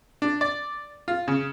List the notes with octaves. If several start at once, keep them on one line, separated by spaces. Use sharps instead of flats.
D4
D5
F4
C#3